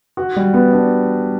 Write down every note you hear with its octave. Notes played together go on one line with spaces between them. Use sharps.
F#4
G3
B3
D4